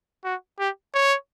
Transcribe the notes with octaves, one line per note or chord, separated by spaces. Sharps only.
F#4
G4
C#5